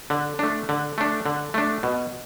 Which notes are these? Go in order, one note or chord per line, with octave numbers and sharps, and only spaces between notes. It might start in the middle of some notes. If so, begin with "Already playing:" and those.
D3
A3 D4
D3
A3 D4
D3
A3 D4
B2